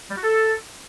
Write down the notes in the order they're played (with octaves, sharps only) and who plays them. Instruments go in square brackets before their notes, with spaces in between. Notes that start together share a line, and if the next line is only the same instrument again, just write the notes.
[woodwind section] G3
F#4
A4